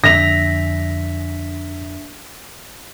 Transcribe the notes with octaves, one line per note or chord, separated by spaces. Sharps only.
F2 D3 D4 E5 A#6 B6 F7